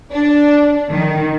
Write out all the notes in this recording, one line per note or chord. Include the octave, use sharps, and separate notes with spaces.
D4
D#3